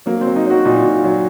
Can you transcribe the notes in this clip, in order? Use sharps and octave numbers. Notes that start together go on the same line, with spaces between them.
F#3 A#3
C4
F#3
D#4
F#3 F#4
A#2 D#4
A#2
F#3